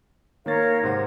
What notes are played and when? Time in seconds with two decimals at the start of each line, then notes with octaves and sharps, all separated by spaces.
0.46 D#3 A#3 A#4 C#5 F5 A6
0.83 G#2 C3 C5 F#5 G#6